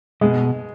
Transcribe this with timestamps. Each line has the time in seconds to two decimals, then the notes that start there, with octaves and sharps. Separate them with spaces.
0.21 B2 G#3